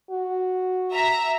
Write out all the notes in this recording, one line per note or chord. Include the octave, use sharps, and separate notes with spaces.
F#4
E5 A#5